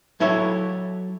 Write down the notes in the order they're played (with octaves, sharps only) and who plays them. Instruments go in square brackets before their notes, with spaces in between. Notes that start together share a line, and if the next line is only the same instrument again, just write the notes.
[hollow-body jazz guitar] F#3 E4 A4 C#5